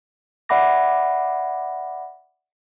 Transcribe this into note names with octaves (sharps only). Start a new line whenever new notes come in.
D5 E5 F#5 B5 D6 A#6